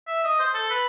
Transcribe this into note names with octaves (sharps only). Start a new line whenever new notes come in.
E5
D#5
C5
A4
B4